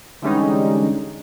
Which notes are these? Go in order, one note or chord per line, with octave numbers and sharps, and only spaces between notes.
D3 E3 G3 G#3 C#4 D#4